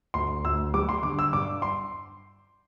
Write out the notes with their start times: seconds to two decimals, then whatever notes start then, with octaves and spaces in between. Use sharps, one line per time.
0.14 D2 C6
0.44 D2 E6
0.74 G3 D6
0.89 C6
1.03 D3 D6
1.19 E6
1.33 G2 D6
1.62 C6